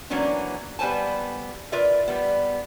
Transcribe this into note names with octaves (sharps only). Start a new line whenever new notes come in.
E3 F#3 A#3 B3 C#4 D4
G3 B3 B4 C5 G#5 A5
F4 A#4 B4 D5 E5
G3 B3